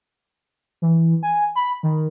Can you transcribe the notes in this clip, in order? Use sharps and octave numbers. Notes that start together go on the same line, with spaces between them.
E3
G#5
B5
D#3